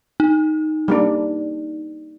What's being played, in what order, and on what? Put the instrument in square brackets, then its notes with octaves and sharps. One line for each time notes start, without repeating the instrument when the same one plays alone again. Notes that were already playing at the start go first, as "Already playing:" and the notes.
[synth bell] D#4
[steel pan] G3 A#3 D4